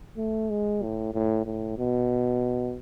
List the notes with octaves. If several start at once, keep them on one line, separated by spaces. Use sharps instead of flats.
A3
G#3
A2
A2
A2
B2